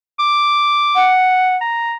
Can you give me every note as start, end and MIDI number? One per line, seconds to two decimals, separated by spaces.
0.19 1.11 86
0.95 1.56 78
1.61 1.95 82